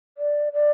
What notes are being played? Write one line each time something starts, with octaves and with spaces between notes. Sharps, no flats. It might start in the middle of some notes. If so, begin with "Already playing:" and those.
D5
D5